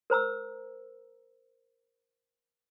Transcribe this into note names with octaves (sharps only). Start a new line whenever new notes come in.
A#4 C5 A#5 E6